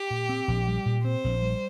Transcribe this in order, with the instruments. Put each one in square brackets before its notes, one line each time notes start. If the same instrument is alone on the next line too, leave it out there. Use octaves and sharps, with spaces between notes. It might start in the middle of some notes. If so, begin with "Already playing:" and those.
Already playing: [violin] G4
[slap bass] A#2
C4
A#1
G3
A#2
[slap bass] C4 [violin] C5
[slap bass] A#1
G3